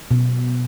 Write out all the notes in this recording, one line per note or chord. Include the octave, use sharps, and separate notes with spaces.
B2